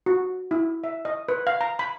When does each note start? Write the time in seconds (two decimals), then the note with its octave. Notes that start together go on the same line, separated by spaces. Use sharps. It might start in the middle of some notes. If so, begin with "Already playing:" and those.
0.06 F#4
0.51 E4
0.84 E5
1.05 D#5
1.29 B4
1.47 F5
1.61 A#5
1.79 B5